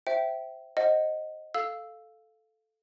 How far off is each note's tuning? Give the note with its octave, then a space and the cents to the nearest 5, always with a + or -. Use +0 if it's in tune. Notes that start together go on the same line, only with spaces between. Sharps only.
C5 +0 E5 +0 G5 -20
C5 +15 D#5 +0 F#5 +0
A4 -5 F5 +0 E6 +0